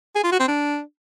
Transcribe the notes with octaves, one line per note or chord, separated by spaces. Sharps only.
G#4
F4
F#4
C4
D4